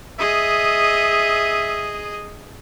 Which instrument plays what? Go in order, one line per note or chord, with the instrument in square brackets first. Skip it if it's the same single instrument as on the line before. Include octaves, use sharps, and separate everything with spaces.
[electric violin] G#4 D#5 [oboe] E5